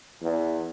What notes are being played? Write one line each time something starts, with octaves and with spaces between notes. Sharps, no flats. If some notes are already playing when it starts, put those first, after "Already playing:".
E2